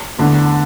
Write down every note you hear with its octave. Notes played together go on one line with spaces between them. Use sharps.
E2 D3 A3